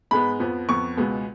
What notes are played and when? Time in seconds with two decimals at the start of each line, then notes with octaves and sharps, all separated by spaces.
0.11 G#2 G#3 B3 B5
0.40 F2 F3 B3
0.69 F2 F3 B3 C#6
0.97 C#2 B2 G#3 B3